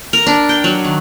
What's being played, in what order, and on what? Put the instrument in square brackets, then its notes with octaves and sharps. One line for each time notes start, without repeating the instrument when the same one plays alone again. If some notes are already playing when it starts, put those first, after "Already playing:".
[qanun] A#4
D4
G5
F#3
D#3